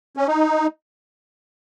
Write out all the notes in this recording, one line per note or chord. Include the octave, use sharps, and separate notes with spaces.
C#4
D#4